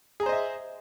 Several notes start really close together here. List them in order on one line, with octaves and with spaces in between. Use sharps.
G#4 A#5 C5 D#5 E5